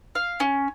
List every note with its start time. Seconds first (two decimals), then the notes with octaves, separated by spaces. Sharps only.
0.15 F5
0.40 C#4